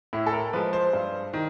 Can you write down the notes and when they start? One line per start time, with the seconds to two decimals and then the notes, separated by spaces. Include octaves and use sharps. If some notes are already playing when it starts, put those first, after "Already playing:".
0.13 A2 E4
0.26 A4
0.33 A#4
0.53 F3 G#3 B4
0.73 C5
0.93 G2
1.33 D#3